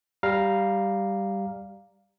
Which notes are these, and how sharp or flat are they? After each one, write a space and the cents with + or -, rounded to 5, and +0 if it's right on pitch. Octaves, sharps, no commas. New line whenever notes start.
G3 +0 F5 +0 A#5 +0